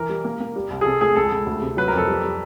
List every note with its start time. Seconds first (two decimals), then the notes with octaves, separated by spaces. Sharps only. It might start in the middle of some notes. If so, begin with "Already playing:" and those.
Already playing: E3 A#4
0.09 G3
0.24 A#3
0.41 A#3
0.56 G3
0.70 C2
0.81 G#4
0.85 C3 A4
1.01 A3 G#4
1.16 C#2 A4
1.32 C#2
1.46 D2
1.62 C3
1.77 F#3 B4
1.88 A#4
1.93 F2 A4
2.08 G3
2.24 G3